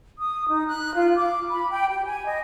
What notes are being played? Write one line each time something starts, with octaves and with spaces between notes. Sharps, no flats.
D#6
D#4
F#6
F4
D6
B5
G5
G4
G#5
D#5